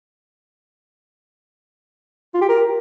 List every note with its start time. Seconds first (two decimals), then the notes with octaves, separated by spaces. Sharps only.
2.34 F4
2.42 G4
2.49 A#4